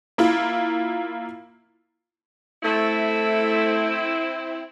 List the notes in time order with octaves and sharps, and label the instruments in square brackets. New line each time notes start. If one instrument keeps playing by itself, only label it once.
[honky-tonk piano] A#3 E4 F4
[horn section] A3 [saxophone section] C4 E4